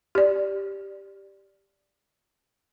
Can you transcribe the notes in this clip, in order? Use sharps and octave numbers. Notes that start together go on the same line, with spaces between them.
G4 D5